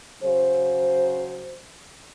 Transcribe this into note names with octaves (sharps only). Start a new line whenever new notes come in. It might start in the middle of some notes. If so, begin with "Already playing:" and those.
C#3 F#3 C5